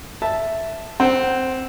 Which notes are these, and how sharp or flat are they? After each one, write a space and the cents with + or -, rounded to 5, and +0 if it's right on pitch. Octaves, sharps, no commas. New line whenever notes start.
E5 +0 A5 +0
C4 +0 F#5 +30